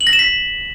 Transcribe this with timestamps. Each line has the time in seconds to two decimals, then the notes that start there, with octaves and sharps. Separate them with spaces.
0.01 F#7
0.07 A#6
0.13 E7
0.19 B6